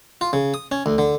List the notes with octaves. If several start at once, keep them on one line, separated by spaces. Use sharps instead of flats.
F4
C#3
D#6
C#4
D2
D3